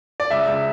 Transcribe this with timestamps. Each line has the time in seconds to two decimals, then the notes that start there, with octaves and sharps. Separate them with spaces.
0.20 D5
0.30 C#2 E5
0.48 C#2